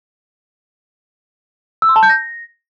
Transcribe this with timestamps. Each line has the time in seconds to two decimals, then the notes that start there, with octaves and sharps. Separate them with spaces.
1.82 E6
1.89 C6
1.96 A5
2.03 G6
2.09 A#6